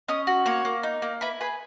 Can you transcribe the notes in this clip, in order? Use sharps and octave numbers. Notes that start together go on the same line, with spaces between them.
C#4 D#5 D#6
F#4
A#3 C#5 C#6
A#3
D#4
A#3
E4 B4 B5
G#4 B4 B5